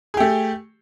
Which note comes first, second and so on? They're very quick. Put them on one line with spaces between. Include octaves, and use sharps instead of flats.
G#4 G4 A3